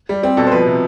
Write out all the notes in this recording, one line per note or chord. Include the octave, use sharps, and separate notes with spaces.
G3
G3 C4
B2 A4
C5
F3 B4
C3